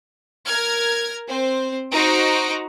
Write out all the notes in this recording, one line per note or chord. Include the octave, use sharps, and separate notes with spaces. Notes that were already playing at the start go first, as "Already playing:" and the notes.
A#4 F6 G#6
C4 C5
D#4 F#4 C5 A#5 D7